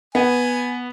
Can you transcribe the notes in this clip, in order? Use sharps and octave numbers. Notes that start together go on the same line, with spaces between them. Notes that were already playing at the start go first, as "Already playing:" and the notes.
B3 G#5